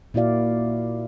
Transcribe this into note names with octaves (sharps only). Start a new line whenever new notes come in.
A#2 A#3 E4 F#4 D5 F5